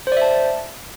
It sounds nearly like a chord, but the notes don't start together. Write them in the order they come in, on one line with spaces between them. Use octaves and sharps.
C5 D5 E5 A5